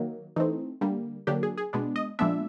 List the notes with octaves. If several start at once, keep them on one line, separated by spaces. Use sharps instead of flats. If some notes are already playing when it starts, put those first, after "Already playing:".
Already playing: D#3 F#3 A#3
E3 A3 C4 D#4
D3 G3 A#3
D3 F#3 A#3 D4 G4
G#4
G#4
B2 G#3 B3 D4
D#5
A#2 F3 G#3 B3 D4 E5